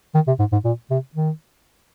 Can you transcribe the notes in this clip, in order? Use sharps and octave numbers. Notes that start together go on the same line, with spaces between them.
D#3
C3
G#2
G#2
A#2
C3
D#3